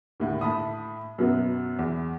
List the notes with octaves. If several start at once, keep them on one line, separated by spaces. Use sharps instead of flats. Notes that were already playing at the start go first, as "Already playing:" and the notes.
D#2 A2 D3
A2 A5 B5 D#6
F#2 B2 F#3 B3
E2